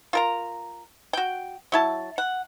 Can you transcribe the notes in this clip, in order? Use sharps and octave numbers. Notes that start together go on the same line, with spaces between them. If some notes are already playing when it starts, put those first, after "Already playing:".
F4 A#4 A#5
F#4 G5
F#3 E4 A5
F#5